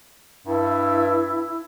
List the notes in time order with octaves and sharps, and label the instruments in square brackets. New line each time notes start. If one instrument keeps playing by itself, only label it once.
[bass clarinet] G2 [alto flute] E4